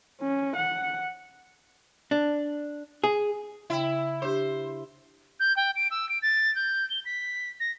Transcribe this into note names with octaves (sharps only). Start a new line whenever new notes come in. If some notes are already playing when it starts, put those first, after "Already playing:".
C#4
F#5
D4
G#4
C#3 E4 G5
D4 G4 C5
G6
G5
D7
E6
D7
A6
G6
G7
B6
A#6